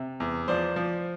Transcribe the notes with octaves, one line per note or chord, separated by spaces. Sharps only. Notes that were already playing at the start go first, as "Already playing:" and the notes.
Already playing: C3
E2
F3 C5 D5
F3